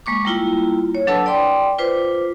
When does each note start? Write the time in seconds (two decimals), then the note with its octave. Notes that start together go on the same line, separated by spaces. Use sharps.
0.06 G#3 A#3 C#6 D6
0.25 G3 A#3 E4 F4
0.95 C#5
1.07 F#3 D4 A4 B4 A5 E6
1.26 D5 G5 C6 D6
1.78 F4 B4 C5 D6